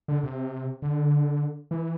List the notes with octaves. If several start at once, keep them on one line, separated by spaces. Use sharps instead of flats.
D3
C3
D3
E3